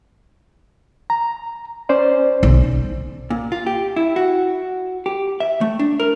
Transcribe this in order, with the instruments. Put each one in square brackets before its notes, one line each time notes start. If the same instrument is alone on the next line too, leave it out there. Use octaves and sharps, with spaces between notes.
[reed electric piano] A#5
C#4 C5 D5
[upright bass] B1 D3
[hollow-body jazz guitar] A#2
F4
G4
E4
F#4
G4
E5
A3
D4
A#4